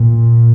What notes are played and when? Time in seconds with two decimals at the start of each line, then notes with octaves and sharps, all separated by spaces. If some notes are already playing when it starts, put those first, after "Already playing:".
Already playing: A#2